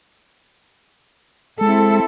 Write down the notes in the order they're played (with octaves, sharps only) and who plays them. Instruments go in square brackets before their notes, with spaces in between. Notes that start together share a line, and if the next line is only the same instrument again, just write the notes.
[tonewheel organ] G#3 [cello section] C4 E4 A4